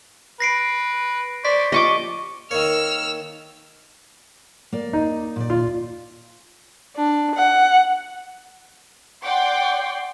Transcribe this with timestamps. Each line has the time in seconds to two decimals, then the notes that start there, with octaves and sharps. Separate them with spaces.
0.40 B4 A#6 C7 D7
1.45 C5 D5 C#6 B6
1.72 F3 G4 D#5 C#6 D6
2.51 D#3 A#3 C#5 E6 F6
4.73 A#3 D5
4.93 D#4
5.36 A#2 D5
5.50 F4
6.97 D4
7.35 F#5
9.24 D5 F#5 G5 C6 D6